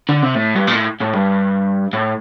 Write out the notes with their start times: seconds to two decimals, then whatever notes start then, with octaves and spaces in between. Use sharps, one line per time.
0.09 D3
0.23 C3
0.35 A2
0.56 G2
0.68 A#2
0.75 A2
1.01 A2
1.14 G2
1.93 A2